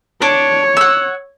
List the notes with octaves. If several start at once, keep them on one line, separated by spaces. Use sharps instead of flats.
D4 C#5
F#5 E6